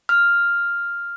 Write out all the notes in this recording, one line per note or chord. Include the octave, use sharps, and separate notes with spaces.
F6